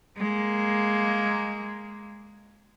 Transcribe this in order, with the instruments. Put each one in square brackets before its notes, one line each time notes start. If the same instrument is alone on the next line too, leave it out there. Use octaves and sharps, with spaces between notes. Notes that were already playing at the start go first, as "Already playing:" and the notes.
[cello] G#3 A#3